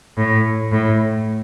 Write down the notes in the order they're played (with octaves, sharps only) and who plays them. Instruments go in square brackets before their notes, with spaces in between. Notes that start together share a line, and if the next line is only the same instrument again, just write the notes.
[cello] A2
A2